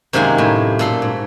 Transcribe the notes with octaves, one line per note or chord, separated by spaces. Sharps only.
F#2 C3 D#3 G#3 A#3 G#5
A2
A#2 A4 C6
G#2